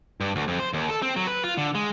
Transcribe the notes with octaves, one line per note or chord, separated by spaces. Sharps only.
G2
D2
F2
C5
D#2
A4
C4
F#3
B4
F4
D3
G#3